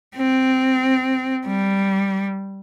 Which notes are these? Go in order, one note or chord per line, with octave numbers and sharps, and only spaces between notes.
C4
G3